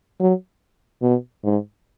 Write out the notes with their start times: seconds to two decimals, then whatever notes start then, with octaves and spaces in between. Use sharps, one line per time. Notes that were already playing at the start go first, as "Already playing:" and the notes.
0.20 F#3
1.02 B2
1.44 G#2